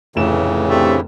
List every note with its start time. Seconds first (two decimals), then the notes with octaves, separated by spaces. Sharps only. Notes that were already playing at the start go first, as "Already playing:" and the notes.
0.16 F1 A2 C#3 E3 E7
0.69 A3 C4 D4 G4